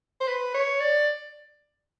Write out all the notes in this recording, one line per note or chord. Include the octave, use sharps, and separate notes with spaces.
C5
B4
C#5
D5